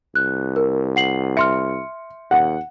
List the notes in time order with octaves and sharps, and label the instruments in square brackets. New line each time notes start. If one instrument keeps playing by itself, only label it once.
[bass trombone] C2 [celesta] F#6
[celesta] A#4
F#5 C7 F#7
[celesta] E5 C6 F6 [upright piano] C#7
[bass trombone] D#2 [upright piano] F#5